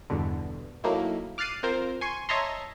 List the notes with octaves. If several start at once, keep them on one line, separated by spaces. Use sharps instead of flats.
E2 G2 B2 D3
F#3 A3 A#3 D#4 E4
D6 F6 F#6 A6 C7 D#7
C4 F4 A#4 C5
G#5 C6 C#6
C#5 D#5 E5 A5 A#5 C6